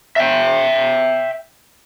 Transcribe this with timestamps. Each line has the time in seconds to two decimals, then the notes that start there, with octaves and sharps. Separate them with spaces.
0.16 E5 G5